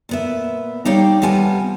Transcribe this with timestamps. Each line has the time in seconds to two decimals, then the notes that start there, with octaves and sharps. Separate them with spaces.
0.09 A#2 B3 E5
0.85 G3 D#4 C#5 D5 F5 G5
1.22 C3 G3 B3 F4 G#5 A5